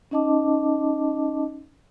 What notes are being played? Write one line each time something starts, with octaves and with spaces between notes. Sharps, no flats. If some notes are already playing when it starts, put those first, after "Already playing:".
C#4 D#4 D#5 A5 D6